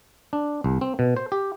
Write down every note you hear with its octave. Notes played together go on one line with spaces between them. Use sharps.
D4
C2
C4
B2
C5
G4